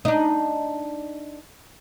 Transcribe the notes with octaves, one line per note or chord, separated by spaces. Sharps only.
D4 D#4